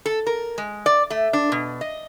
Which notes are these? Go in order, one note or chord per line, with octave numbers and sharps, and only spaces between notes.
A4
A#4
G#3
D5
A3
D4
B2
D#5